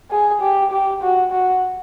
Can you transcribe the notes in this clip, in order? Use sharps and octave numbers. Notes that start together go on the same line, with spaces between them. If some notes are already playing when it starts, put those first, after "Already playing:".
G#4
G4
G4
F#4
F#4